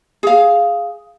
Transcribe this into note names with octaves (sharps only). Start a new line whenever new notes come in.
G#4 F5